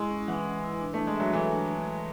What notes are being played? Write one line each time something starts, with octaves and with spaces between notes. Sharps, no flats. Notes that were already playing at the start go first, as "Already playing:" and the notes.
Already playing: G#3 E4
C#4
E3 F#5
B4
E4
D4
A3 D4
G#3
F#3 E5
E3 A4
D4